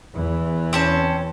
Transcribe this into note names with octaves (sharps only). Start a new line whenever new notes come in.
E2 E3
C4 C#4 A5